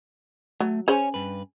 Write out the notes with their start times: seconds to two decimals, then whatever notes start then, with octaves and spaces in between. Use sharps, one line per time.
0.60 F#3 A3
0.88 C#4 G#4 C5 C#5 F#5 G#5
1.14 G2 B4